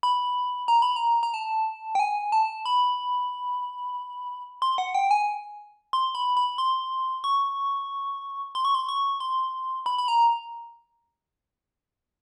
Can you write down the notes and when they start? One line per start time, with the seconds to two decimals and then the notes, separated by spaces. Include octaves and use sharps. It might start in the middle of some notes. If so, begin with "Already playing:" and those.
0.03 B5
0.68 A#5
0.82 B5
0.96 A#5
1.23 A#5
1.34 A5
1.95 G5
2.00 G#5
2.32 A5
2.66 B5
4.62 C6
4.78 F#5
4.95 G5
5.11 G#5
5.93 C6
6.15 B5
6.37 B5
6.58 C6
7.24 C#6
8.55 C6
8.65 C#6
8.74 C6
8.89 C#6
9.20 C6
9.86 B5
9.98 B5
10.08 A#5